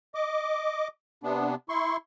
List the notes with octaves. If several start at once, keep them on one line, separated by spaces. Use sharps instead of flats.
D#5 D6
C3 B3 D4
E4 C6 C#6